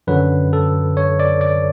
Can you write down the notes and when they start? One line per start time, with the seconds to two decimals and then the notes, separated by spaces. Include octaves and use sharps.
0.07 F#2 D3 F#3 B4
0.53 A4
0.97 C#5
1.20 D5
1.41 D5